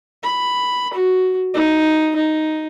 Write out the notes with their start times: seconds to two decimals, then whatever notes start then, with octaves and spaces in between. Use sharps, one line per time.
0.23 B5
0.93 F#4
1.54 D#4
2.16 D#4